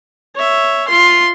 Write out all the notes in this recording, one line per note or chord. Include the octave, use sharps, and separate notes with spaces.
C#5 E5
F4 C6